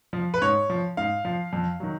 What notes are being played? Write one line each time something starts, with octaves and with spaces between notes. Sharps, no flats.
F3
B4
G#2 C#5
F3
G#2 F5
F3
F2
D#3 F#3